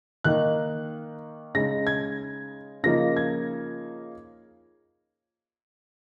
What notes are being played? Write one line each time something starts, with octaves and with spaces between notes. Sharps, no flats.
D#3 A#3 D#4 F#6
C#3 G#3 D#4 A#6
G#6
C#3 F3 A#3 D#4 A#6
G#6